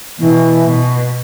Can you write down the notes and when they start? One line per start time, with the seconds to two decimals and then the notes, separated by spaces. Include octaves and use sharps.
0.18 B2 E3
0.64 B2